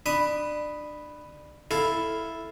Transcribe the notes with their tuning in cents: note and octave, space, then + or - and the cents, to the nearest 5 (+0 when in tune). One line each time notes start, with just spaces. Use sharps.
D4 +25 B5 +0 D#6 +0
E4 +0 A4 +0 F5 +0